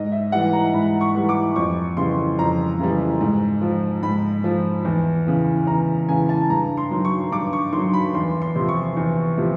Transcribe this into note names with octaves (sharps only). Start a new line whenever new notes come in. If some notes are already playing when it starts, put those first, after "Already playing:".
Already playing: G#2 D#5
E5
E3 G3 F#5
A#5
G#2 B5
C#6
E3 G3
D6
F2 C#6
C#3 E3 G3 C6
F2 A#5
C#3 E3 G3
G#2
F3
G#2 B5
F3
E2
C#3 E3
E2 A#5
C#3 E3 G#5
A5
G2 A#5
C6
D#3 F#3
C#6
G2 D6
C#6
D#3 F#3 C6
B5
E2 C6
C6
C3 F3
C#6
E2
C3 F3